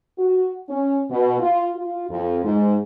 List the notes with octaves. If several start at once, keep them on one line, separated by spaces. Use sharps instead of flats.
F#4
C#4
B2
F4
F4
F2
G#2